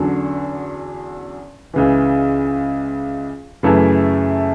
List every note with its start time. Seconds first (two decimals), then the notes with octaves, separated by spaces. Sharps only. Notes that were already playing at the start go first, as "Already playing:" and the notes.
Already playing: E2 D3 F#3 C#4
1.74 C#2 C#3 E3
3.63 F#2 C#3 E3 A3 E4